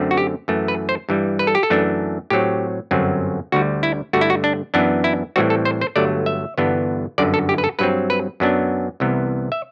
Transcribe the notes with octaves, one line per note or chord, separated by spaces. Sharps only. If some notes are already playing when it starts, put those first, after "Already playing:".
Already playing: F#2 D3 A3 C4
F#4
G4
F#2 E3 A3
B4
C5
G2 E3 G3
B4
A4
G4
A4
F#2 E3 A3 D4
A2 F#3 C4 G4
G1 F#2 F#3 C4
D2 D3 G3 F#4
E4
G2 D3 A3 F#4
E4
F#4
D4
F#2 E3 B3 D4
E4
A2 E3 G3 C4 F#4
A4
C5
C5
G1 G2 F#3 A3 D5
E5
G1 G2 E3 B3 D4
G1 F#2 D3 D5
A4
G4
B4
A4
G2 F#3 C4 B4
B4
F#2 F#3 B3 D4
C2 C3 E3 B3
E5